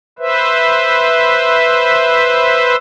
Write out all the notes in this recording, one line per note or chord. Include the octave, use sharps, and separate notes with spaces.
B4 C5 E5